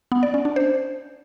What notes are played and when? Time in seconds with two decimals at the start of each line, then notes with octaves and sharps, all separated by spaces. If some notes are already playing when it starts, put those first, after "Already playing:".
0.12 B3
0.23 D5
0.34 C#4
0.45 D4
0.56 C5